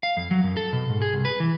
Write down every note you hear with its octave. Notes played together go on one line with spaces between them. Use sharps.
F5
F2
F#3
F#2
A4
B2
G#2
G#4
C2
B4
E3